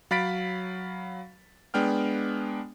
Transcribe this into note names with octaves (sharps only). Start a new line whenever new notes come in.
F#3 F5 B5 A6 B6 D7
G#3 B3 D4 G5 F6